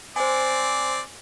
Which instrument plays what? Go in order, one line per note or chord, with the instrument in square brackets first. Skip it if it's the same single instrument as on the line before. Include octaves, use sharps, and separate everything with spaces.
[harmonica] C4 D5 [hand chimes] C5 G#5